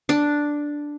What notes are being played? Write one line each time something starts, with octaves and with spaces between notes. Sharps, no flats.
D4